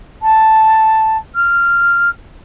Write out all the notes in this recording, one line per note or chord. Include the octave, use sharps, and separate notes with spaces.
A5
F6